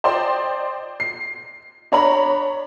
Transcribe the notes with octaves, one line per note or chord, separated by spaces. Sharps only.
C5 D5 D#5 G5 C6
C7
D4 C#5 A#5 B5